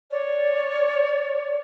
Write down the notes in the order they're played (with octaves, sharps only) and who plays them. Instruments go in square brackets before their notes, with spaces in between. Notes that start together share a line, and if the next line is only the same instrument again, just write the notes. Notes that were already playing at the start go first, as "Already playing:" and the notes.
[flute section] C#5 D5